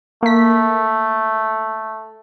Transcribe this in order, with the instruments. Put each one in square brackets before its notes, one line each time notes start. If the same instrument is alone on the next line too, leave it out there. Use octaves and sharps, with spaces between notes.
[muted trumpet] A3 [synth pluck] A#3 B6